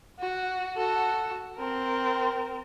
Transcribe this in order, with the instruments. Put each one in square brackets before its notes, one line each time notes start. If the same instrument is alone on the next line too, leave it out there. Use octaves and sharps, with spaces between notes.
[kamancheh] F#4
F#4 A4
C4 A#4